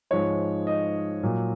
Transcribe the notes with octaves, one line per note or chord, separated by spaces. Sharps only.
G#2 F3 G#3 C#5
D#5
A#2 F#3